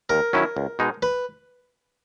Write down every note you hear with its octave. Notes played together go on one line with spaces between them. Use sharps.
D#2 A#4
D#3 F#3 C#4 E4
C#2
B2 G#3 D#4
B4